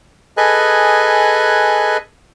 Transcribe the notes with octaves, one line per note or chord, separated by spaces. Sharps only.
G#4 A4 B4 D#5 G#5 F#6